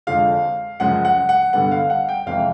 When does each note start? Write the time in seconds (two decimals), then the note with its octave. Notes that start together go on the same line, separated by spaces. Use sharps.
0.07 F2 D3 F3 G#3 F5
0.80 F#2 C#3 F3 G#3 F#5
1.05 F#5
1.29 F#5
1.53 G2 D3 G3 B3 F#5
1.72 F5
1.90 F#5
2.09 G5
2.26 F2 C3 E3 G#3 F5